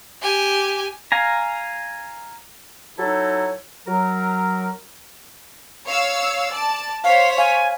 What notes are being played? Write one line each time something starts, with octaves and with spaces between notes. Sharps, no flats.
G4 G#5
F5 G#5 A#5
F#3 D#4 E4 A4 C#5
F#3 A#4
C#5 F5 E6
D5 A5
C5 C#5 F5 B6
F5 G#5